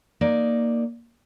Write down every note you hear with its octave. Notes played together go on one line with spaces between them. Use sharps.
A#3 D#4 D5